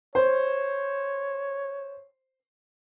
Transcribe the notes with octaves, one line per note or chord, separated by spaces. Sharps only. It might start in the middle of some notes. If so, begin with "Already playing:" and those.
C5 C#5